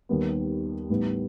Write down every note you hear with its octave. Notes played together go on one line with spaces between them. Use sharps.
D#2 D#3 G3 B3
A1 A2 G3 B3 D#4